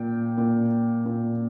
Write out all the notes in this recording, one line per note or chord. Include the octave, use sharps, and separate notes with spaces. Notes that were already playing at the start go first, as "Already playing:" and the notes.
Already playing: A#2 G5
A#2
A#2